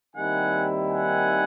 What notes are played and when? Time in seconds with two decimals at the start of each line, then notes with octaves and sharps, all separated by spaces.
0.16 D#2 D#3 G3 C4 E4 F#5 G#5
0.90 F#5 G#5